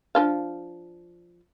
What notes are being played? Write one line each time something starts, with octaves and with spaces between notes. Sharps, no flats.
F3 D4 F5